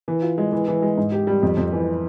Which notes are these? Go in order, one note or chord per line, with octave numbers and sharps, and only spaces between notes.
E3
F4
G#3
E3
E3
G#3
G#2
G4
G3
F2
F2
E3